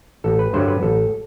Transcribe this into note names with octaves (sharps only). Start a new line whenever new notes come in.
A1 A4
B4
G2 D3 F#3 C5
B4
A1 A4